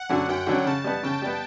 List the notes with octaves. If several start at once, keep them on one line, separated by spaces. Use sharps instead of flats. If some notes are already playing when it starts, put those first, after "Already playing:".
Already playing: F#5
D3 F#3 C#4
F#2 G5
D3 F#3 C#4
C#3 A5
G3 B3
C#3 G5
G3 B3